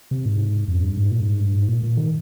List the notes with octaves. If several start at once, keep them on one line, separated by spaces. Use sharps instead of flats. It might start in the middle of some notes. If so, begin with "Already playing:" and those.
C3
G#2
F2
G2
G#2
A#2
G2
G#2
G2
G#2
A#2
A#2
D#3